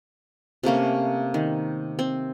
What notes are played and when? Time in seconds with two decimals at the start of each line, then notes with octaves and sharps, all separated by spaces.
0.63 C3 A3 A#3 C#4
1.34 D#3
1.99 C4